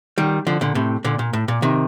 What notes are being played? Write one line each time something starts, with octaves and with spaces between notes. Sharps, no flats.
D#3 G3
D3 F3
A#2 D3
A2 C3
A#2 D3
A#2
A2
A#2
C3 D#3